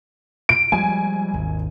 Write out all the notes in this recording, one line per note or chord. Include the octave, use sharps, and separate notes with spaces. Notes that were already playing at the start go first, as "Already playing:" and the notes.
D7
F3 G3 G#3 G#5
G#1 D#2